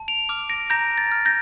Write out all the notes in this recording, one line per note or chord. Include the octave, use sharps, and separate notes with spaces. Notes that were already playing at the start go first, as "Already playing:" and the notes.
Already playing: A5
D7 F7
D6 F6
A#6 D7
A#5 G6 A#6
A6
F6
G6 A#6